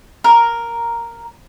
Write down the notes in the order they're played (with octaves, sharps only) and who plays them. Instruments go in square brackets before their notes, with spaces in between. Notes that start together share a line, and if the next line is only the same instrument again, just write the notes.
[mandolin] A#4